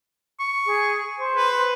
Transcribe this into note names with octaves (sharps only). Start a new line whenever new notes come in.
C#6
G#4
C5
B4